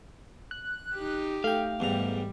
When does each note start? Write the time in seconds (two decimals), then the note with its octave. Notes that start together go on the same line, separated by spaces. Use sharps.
0.51 F#6
0.95 D#4 G4
1.44 A3 F5 G5
1.80 E2 G#2 G3 A#5